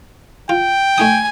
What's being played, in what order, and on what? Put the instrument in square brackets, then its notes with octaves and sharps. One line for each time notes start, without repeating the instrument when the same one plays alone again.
[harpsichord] F4 [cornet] G5
[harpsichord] A3 D#4 D#6 [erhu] G#5